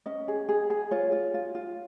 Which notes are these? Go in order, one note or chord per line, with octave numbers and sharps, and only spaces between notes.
C#4 D#5
G#4
G#4
G#4
F4 C#5
F4
F4
F4